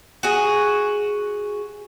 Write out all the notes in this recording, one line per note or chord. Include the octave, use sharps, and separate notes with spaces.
F#4 G#4